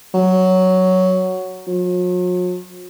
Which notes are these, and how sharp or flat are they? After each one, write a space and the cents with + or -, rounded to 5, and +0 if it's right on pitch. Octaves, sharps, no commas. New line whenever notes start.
F#3 +5
F#3 -45